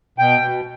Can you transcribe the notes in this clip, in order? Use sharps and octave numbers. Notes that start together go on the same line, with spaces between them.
B2 G5
B2